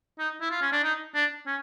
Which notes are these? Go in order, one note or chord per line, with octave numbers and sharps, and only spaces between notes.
D#4
E4
F4
C#4
D4
D#4
D4
C#4